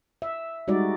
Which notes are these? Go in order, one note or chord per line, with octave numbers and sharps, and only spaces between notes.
E5
G3 G#3 D#4 F#4 D5